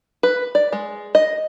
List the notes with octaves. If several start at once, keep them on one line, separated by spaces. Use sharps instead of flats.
B4
D5
G#3
D#5